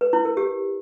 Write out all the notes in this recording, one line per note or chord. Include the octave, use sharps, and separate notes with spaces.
B4
E4
A#4
G4